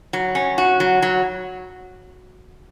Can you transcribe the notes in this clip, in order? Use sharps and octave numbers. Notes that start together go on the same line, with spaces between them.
F#3
C#4
F#4
F#3
F#3